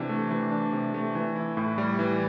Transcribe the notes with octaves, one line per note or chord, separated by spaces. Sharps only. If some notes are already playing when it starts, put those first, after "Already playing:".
Already playing: C3 E3 D4
A3
E3
D4
C3
A3
E3
E4
A2
G3
E3